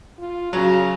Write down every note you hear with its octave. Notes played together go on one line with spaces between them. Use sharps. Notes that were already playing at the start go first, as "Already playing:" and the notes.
F4
C#3 F#3